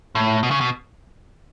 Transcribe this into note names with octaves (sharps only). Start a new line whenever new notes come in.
A2
B2
C#3
B2